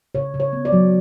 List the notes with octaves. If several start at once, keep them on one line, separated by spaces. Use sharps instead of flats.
C#3 C#5
C#3
C#5
B3
D5
F#3